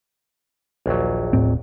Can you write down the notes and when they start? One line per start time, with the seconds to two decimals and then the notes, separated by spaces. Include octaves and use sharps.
0.86 A#1 D#2 F#3
1.33 D#1 A2 C4